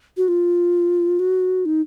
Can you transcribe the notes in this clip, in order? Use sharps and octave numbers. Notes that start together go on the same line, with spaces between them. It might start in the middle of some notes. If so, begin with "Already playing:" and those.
F#4
F4
F#4
D#4